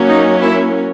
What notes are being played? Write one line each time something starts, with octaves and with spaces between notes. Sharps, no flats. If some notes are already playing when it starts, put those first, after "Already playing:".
Already playing: F#3 A#3 C#4
D#4
E4